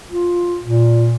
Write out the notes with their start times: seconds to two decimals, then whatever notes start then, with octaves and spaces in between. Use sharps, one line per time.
0.10 F4
0.63 A#2